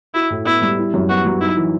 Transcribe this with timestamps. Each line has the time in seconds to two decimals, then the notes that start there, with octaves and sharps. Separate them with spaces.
0.14 E4 F#4
0.30 A2
0.45 B3 E4
0.62 G3
0.78 E4
0.94 F#2
1.09 B3 F#4
1.25 F#3
1.41 D#4 E4
1.57 E3